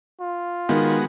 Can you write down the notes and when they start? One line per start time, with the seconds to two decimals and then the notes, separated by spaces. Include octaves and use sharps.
0.21 F4
0.69 D#3 G#3 B3 F#4